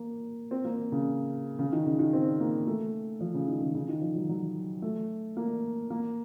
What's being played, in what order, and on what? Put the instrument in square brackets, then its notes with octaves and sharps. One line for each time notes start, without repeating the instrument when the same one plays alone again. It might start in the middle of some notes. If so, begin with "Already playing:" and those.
Already playing: [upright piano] A#3
C4
A#3
C#3
C#3
D#3
C#3
D#3
C4
A#3
A3
F3
C#3
D#3
C#3
C#3
D#3
F3
F#3
F#3
A3
A#3
A#3